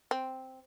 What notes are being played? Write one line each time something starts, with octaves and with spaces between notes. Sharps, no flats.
C4